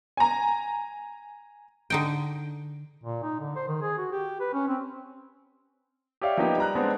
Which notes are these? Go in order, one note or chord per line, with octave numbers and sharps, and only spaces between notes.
G#5 A#5
D3 D#4 G5
A#2
D#4
D3
C5
D#3
G#4
F#4
G4
B4
C#4
C4
G4 C#5 D5 E5 F5
F3 A#3 B3 D#4 G4
G3 A#5 F#6
G#3 B3 C4 D4